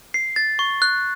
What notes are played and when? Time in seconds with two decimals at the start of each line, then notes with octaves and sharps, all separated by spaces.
0.14 C7
0.36 A6
0.59 C#6
0.82 F#6